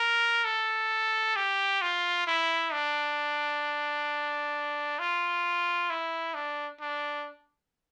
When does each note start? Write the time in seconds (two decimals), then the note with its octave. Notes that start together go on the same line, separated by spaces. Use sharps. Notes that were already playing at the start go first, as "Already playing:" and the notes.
Already playing: A#4
0.44 A4
1.36 G4
1.82 F4
2.27 E4
2.73 D4
4.99 F4
5.90 E4
6.34 D4
6.81 D4